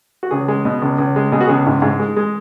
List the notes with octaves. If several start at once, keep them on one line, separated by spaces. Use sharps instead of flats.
F#4
C#2 G#4
G#3
B2
C#2
C#2
G#3
B2 G#4
F#4
C#2 G#4
G#2
G#2
G#3
G#3